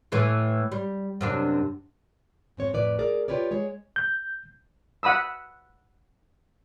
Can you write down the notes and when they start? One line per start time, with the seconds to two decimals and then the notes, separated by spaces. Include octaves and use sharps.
0.12 A2 E3 A3
0.72 G3
1.21 F#2 C3 D4
2.57 G#2 C4 C#5
2.73 F2 A2 B4 D5
2.99 G#4 A#4 D5
3.28 F4 G4 B4 C#5 D5
3.51 G#3 C#5
3.96 G6
5.03 F#5 B5 D#6 E6